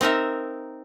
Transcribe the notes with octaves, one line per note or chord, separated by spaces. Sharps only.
C4 D#4 A#4 E5